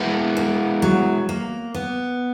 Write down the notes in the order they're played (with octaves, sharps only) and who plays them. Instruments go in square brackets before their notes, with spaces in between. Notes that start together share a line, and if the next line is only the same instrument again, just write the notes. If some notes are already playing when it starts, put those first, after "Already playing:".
Already playing: [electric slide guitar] G#3 B3 E4 [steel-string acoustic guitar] A#3
[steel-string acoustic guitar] A#3
F#3
A#3
B3